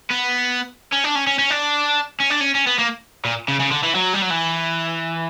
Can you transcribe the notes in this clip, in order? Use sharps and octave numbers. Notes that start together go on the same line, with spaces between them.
B3
C#4
D4
C#4
C#4
C#4
D4
C#4
D4
C#4
C#4
B3
A#3
A#2
C#3
C#3
D3
E3
F#3
G3
F#3
E3